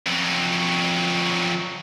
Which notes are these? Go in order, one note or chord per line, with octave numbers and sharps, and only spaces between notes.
F2 F#3